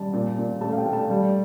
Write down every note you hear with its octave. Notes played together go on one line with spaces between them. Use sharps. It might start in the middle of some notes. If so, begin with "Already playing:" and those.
Already playing: G3 A5
A#2
A#2
A3 A5
F5
G5
A3
A5
G3